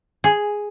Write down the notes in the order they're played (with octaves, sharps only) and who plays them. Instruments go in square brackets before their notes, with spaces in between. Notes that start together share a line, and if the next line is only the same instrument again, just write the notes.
[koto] G#4